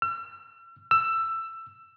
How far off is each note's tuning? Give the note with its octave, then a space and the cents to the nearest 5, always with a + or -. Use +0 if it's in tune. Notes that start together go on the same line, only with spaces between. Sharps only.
E6 +45
E6 +15